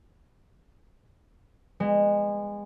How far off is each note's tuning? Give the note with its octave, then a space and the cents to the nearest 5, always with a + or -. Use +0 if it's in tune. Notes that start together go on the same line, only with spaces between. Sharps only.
G#3 -25 B3 +0